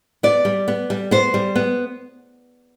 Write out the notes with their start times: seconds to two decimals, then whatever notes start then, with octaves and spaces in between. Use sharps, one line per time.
0.23 B3 D5
0.45 G3
0.68 B3
0.90 G3
1.11 B3 C5
1.34 G3
1.55 B3